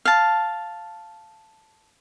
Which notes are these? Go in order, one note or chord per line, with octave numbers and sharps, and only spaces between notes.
F5 A5